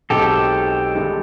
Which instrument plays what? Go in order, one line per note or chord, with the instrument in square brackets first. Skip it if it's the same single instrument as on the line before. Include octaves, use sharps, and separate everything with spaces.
[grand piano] B1 B2 G#3 C4 [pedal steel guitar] G4 A4
[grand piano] G1 G2 D#3 G#3